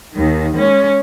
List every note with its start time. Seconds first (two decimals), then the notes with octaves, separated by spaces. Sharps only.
0.13 D#2 D#3
0.56 G#3 C#4